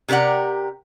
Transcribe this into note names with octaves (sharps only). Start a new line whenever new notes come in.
C3 G4 A#4 D5 F#5